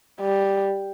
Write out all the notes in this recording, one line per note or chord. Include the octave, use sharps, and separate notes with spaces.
G3